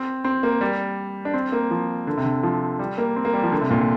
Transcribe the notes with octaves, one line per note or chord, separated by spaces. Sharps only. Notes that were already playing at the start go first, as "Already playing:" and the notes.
Already playing: C4
C4
A#3
G3
D4
C4
A#3
F3
D3
C3
D3
F3
G3
A#3
C4
A#3
G3
F3
D3
C3
A#2
D3